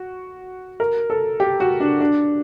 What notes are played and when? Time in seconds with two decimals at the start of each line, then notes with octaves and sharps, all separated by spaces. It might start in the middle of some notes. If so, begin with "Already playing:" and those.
Already playing: F#4
0.80 A#4
1.10 A4
1.40 G4
1.60 F#4
1.80 D4
2.00 D4